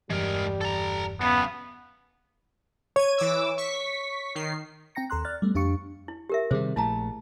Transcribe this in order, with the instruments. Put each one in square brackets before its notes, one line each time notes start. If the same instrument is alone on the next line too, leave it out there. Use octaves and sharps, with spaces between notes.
[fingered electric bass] E1 G2 E3 [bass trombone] G3 [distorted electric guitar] G#3 A#4
[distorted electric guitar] A4 A#5
[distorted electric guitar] F#2 C#3 [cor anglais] B3
[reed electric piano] C#5 [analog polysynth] G#6 D#7
[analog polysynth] E3 D6 E6
C#6 B6
D#3 C7
[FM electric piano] C4 G5 A#5 A#6 C#7
D#2 A4 A#5 C6 F#6
D5 F6 F#6 A6
G3 A3 B3
F2 D4 G4 F5 C#6 C#7
[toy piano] E4
G4 A#4 E5
[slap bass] C3 D#3 G3 [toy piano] G#4 C5
[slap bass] A#1 A3 [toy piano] E4 A5 A#5